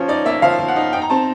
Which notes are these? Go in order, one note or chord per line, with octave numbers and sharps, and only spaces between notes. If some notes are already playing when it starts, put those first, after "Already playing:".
Already playing: F3 C#4
D#4 D5
A#3 E5
F3 F5
F3
F#5
D#4
D#4 G5
A#5
C4 A5